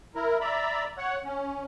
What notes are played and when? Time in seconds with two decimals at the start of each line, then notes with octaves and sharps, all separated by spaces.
0.15 E4 A#4
0.40 D5 E5 A#5 B5
0.98 C#5 F#5
1.25 C#4